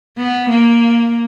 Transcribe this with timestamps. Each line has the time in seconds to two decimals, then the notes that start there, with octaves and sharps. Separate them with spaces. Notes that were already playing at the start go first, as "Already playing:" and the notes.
0.17 B3
0.49 A#3